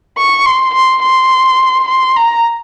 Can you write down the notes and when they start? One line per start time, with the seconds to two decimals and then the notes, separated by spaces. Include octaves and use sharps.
0.18 C#6
0.46 C6
0.74 C6
1.02 C6
1.88 C6
2.17 A#5